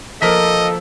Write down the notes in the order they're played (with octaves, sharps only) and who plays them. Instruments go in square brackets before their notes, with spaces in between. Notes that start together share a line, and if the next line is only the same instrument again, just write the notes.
[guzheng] F3 A#3 [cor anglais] A4 [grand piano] A#4 B6 [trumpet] D#5